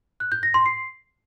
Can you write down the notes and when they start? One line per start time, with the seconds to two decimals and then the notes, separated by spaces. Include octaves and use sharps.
0.20 F#6
0.32 G6
0.43 A#6
0.54 C6
0.66 C7